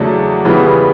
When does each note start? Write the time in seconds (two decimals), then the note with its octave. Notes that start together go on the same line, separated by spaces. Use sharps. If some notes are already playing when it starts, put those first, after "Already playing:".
Already playing: E2 C#3 F#3 A3 D4
0.45 C#3 E3 G3 B3